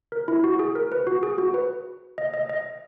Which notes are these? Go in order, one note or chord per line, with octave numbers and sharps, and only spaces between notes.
A#4
E4
F#4
G#4
A#4
B4
F#4
G#4
F#4
B4
D#5
D#5
D#5